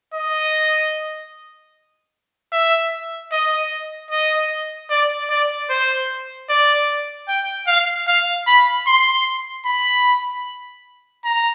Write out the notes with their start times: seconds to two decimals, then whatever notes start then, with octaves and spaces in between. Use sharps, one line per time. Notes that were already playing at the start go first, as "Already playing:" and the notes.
0.14 D#5
2.52 E5
3.32 D#5
4.11 D#5
4.90 D5
5.30 D5
5.69 C5
6.49 D5
7.28 G5
7.68 F5
8.08 F5
8.47 B5
8.87 C6
9.66 B5
11.24 A#5